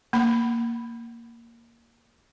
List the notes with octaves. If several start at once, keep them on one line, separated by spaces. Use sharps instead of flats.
A#3 B5